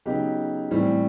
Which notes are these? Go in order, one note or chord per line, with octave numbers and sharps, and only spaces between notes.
C#3 F#3 B3 D#4 G4
A2 E3 G3 C4